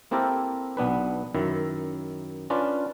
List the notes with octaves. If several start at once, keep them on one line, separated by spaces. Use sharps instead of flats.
A#3 C4 E4 G4 A4 A#4
B1 B3 D4 B4
F#2 D#3 E4
C#4 D4 F4 B4 D5